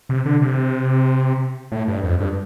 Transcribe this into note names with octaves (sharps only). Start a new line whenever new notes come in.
C3
D3
C3
A2
G2
F2
G2